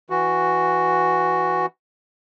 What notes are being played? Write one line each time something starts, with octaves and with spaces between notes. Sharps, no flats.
E3 F#4